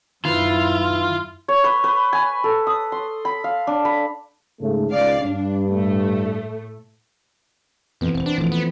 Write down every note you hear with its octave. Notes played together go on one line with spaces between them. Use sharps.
F#2 D#3 E4 F4 B4
C#5
B4
B4
G#5
A4
D#6
C6
B5
F5
D4
B5
G#2 C#3 A3
C#2 G#2 D5 F5
G2 D4
A2 A3
F2 E3 B3 C4
E1 C4
D4
D1 E3 F3 A3
B3